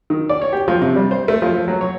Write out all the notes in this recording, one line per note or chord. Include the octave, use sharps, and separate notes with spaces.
D#3
D5
C#5
G4
F3
C3
G3
C5
A3
F3
F#3
C#5